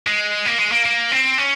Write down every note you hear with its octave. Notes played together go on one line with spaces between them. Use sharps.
G#3
A#3
G#3
A#3
A#3
C4
C#4